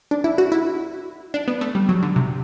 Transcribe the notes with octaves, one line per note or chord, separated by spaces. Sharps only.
D4
E4
F#4
E4
D4
B3
A3
G3
F#3
D3
C3